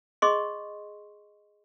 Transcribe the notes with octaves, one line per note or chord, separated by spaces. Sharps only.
G#4 D#5 C6 C#6